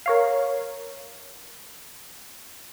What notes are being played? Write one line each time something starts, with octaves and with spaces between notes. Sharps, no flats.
A#4 C#5 F5